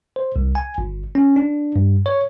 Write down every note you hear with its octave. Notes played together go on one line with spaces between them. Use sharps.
C5
C2
G#5
G1
C#4
D4
G2
C#5